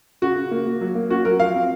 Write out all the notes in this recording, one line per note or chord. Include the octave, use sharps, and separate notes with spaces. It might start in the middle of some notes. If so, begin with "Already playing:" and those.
C#3 F#4
C#3
A#3
A#3
F#3
A#3
C#4 F#4
F#3 A#4
F3 F5
C4